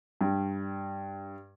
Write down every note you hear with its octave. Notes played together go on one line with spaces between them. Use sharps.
G2